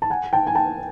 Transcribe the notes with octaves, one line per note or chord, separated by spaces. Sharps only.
A5
F#5 G#5
G5 A5
G#5
G5 A5